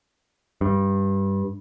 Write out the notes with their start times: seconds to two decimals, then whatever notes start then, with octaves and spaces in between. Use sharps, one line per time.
0.61 G2